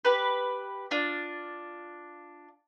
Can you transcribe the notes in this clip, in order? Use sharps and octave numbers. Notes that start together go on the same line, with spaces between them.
G4 B4
D4 F4